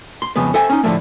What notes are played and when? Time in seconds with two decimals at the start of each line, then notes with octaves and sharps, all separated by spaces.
0.22 C6
0.36 F2 C#3 G#3 B3 B4
0.54 A4 C5 E5 G5 G#5
0.70 C#4 D#4
0.83 A2 D3 F3 A3 A#3